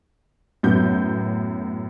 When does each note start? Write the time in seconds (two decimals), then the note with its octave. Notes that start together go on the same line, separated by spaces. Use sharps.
0.63 F#2 A2 B3 G6